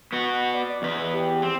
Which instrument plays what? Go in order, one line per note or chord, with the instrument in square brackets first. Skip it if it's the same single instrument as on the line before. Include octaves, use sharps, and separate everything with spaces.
[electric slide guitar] B3 F#4 [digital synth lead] F#5
[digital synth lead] D5
[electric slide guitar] E2 B4 [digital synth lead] D#5
[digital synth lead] G4
[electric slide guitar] C4